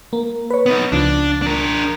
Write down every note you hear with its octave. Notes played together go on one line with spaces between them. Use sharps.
A#3
B4 C#5
B3 D#4
C#2 F3 D4
D4 A#4